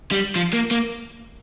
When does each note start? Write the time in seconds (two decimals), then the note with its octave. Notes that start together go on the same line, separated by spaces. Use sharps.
0.11 G3
0.36 F3
0.53 A#3
0.71 A#3